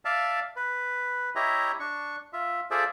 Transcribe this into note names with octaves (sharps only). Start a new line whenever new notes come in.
D5 E5 F5 A5
B4
E4 G4 C#5 D#5 E5 A#5
D4 C#6
F4 E5
F4 G#4 A4 C5 D5 E5